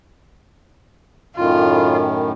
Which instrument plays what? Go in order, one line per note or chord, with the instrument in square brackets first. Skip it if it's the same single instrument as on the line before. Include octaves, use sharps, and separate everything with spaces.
[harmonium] F#2 A2 D#3 [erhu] F4